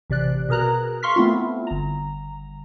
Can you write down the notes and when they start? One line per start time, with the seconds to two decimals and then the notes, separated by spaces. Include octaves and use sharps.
0.10 A1 C3 D5 F#6
0.49 B2 G#4 A#4 A#5 F#6
1.03 F5 C6 C#6 F6 B6
1.16 A3 B3 C4 E4 F4
1.67 G1 A#5